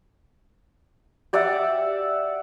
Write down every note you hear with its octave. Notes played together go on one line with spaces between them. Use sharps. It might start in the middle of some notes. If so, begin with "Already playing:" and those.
G4 D5 E5 F#5